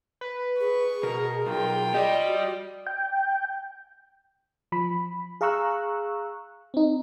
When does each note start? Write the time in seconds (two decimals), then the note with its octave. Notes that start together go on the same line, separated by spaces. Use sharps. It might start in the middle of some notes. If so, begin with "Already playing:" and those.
0.21 B4
0.60 G#4 C#6
1.03 B2 A#4
1.46 B1 F4 G5
1.94 G4 D5 D#5
2.26 F#4
2.87 G5
4.72 F3 B5
5.41 G#4 F5 A#5 C#6 E6 F#6
6.74 C4 D#4